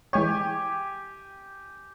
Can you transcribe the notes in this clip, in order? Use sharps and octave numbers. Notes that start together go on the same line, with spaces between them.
E3 G#3 G4 C#5 G#5